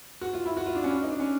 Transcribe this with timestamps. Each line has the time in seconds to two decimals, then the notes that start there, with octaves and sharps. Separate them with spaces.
0.21 F#4
0.33 F4
0.46 E4
0.57 F#4
0.66 F4
0.75 D4
0.84 C#4
0.93 D4
1.02 D#4
1.11 D4
1.20 C#4